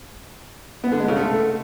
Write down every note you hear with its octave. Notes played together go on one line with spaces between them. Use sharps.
B3
D3
G#3
C#3
A3